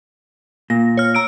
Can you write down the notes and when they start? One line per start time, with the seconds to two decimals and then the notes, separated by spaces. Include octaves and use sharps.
0.70 A#2 A#6
0.97 C#5 F6
1.15 A#5 E6 D7